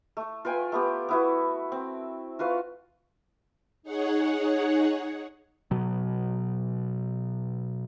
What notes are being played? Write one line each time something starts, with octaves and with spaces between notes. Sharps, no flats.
A3
F4 B4 G5 G#5
A3 B3 G4
B3 E4 F#4
C4
F4 F#4 B4 F5
D#4 G#4 C#5 F#5
B2 F#3